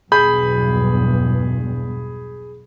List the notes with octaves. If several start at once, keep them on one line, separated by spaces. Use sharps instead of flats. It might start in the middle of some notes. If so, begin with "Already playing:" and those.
B1 E2 G2 G#4 B5 G6